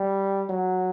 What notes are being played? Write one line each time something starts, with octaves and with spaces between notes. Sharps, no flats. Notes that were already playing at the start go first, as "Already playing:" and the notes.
Already playing: G3
F#3